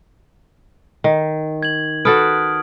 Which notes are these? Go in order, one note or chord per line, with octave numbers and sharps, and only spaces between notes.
D#3
G#6 F#7
F#4 A4 B4 D#6 F6 D7